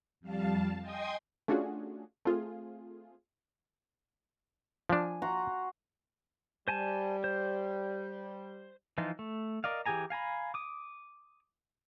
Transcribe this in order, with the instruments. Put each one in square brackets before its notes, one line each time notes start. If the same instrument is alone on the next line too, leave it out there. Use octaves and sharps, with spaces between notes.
[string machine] F2 G3 F5 A5
D#5 G5 G#5 C6 D#6 G#6
[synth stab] A3 C#4 D4 F4 F#4 G#4
A3 C4 F4 G#4
[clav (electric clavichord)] F3 D4 [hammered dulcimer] G#5
[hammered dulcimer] F#4 A#5 C6
[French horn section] G3 [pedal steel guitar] C5 G#5 A5
[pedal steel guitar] C5
E3 F3 D#4 F4
A3
A#4 D5 D#5 F5
E3 G4 G#4 G#5 A#5
F5 G#5 A#5 B5
D6 D#6